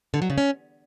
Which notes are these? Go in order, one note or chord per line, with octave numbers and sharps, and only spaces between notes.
D3
F#3
C#3
C#4